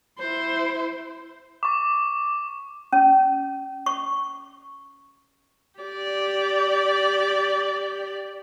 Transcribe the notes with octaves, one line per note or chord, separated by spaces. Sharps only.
E4 C5
C#6 D6
C#4
C#6
G4 D5